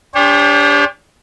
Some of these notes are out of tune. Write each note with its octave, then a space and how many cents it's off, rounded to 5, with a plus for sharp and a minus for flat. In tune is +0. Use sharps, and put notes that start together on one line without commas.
D4 -30 G4 +30 C5 +40